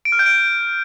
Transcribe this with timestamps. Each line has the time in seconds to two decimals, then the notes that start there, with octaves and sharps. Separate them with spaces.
0.05 D7
0.12 F6
0.19 G6
0.26 D7